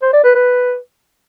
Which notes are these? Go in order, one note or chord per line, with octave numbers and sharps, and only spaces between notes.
C5
D5
B4
B4